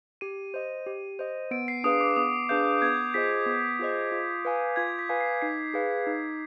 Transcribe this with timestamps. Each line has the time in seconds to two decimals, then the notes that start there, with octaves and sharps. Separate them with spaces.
0.21 G4 D#7
0.54 C5 D#5
0.86 G4
1.19 C5 D#5
1.51 B3 D7
1.68 C7
1.84 D4 G#4 B4 F5 D#6
2.01 D6
2.16 B3 D#6
2.49 D4 G#4 B4 F5 G6
2.82 B3 G#6
3.14 F4 G#4 C5 D#5 B6
3.46 B3
3.79 F4 G#4 C5 D#5
4.12 F4
4.45 B4 F5 G#5
4.76 F4 G#6
4.99 B6
5.09 B4 F5 G#5
5.21 C7
5.42 D#4 C7
5.74 G#4 B4 F5
6.07 D#4